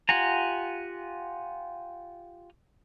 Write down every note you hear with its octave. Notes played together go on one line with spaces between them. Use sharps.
F4 G4 F#5 G#5 A#5